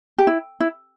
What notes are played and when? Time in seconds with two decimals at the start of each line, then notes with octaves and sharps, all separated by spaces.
0.18 G4
0.27 E4
0.60 E4